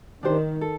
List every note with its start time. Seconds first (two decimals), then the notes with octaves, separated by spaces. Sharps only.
0.23 D#3 D4 G4 C5
0.61 A4